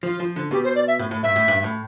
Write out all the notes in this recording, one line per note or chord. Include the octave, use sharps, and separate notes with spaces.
F3 F4
F3
D3
B2 G4
C5
D5
E5
A2
A2
G2 E5
A2
G2
A2